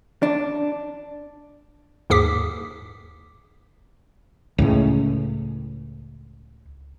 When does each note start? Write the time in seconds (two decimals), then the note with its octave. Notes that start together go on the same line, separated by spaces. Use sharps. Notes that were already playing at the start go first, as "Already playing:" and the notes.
0.23 D4
2.10 D#2 G#2 G#4 D6 D#6 B6
4.58 C#2 A2 C#3